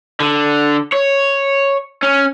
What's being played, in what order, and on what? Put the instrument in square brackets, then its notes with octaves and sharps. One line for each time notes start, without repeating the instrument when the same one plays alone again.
[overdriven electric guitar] D3
C#5
C#4